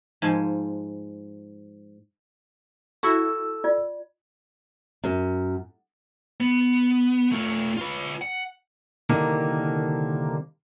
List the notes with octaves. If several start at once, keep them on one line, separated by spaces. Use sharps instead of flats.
G#2 F3 G#5 A5
E4 F#4 A4 E6
F4 D5
F#2
B3
A3 F4
F4 B4
F#5
C2 D3 D#3 A#3